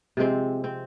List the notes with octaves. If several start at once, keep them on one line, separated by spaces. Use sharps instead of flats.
C3 F3 G#3 C4
C4